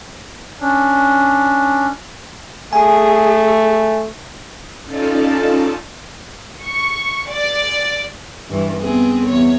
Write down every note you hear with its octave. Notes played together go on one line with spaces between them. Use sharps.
C#4 D4
A3 G#4 G#5
C#4 D#4 F4 A4 D5 A5
C#6
D5
G2 E3
B3 C4 G#4
E2 C#5